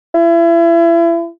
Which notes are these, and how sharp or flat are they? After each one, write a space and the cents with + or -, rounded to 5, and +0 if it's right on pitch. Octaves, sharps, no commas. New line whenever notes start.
E4 +35